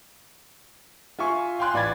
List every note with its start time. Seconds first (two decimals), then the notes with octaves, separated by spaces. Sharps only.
1.19 F4 E5 G#5 C#6
1.59 F5 G5 G#5 C6 F#6
1.74 A1 D5 B5 G#6 A6